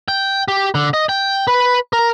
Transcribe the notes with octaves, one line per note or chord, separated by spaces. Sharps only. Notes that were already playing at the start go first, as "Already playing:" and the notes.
G5
G4
D3
D#5
G5
B4
A#4